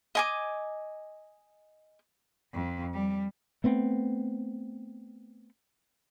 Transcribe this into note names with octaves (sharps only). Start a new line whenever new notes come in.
D#5 G#5 D6
F2
G3
A3 B3 C4